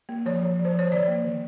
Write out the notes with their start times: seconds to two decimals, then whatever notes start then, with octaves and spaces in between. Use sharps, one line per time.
0.09 A#3
0.26 F3 C#5
0.42 F3
0.59 F3
0.65 C5
0.74 F3 C#5
0.91 D#3 D5
1.08 A#3
1.24 D#3